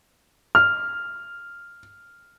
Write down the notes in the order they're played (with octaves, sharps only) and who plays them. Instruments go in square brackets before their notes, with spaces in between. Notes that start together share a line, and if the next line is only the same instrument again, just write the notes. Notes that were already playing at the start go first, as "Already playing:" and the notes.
[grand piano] F6